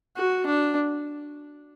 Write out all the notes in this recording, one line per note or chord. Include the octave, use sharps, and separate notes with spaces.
F#4
D4